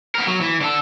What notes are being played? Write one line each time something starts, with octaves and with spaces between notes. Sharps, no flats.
B3 A#4
F#3
E3
D3 A4